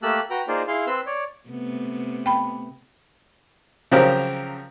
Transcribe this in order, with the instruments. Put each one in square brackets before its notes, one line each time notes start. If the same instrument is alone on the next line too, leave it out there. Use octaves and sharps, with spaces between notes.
[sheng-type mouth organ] A3 A#3 G4 A5 E6 F#6
F#4 B4 G5 A#5
A#3 D#4 F4 G#4 C5 D5
E4 G#4 F5 C6
C4 B4 C6 E6
C#5 D5
[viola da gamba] C3 A3 B3
[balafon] G5 B5
[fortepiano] C#3 F3 F#3 C4 G4 A#4